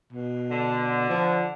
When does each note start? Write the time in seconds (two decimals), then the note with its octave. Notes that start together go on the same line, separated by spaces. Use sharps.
0.12 B2
0.50 D3
1.09 F3